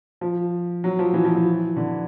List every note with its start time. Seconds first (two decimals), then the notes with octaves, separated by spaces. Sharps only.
0.21 F3
0.84 F#3
0.99 F3
1.14 E3
1.25 F3
1.35 E3
1.77 D3